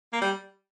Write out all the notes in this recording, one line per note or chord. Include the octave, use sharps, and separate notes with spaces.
A#3
G3